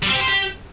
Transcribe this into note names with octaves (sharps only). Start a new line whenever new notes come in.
G3
C4
G4
C5
G4